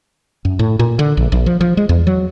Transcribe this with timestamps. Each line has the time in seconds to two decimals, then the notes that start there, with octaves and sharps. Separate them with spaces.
0.45 F#2
0.59 A2
0.79 A#2
0.99 D3
1.17 A#1
1.32 A#1
1.46 F3
1.61 F3
1.77 G#3
1.89 E2
2.07 F#3